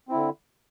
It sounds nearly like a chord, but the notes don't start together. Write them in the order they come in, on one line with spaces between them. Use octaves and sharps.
C4 E4 D3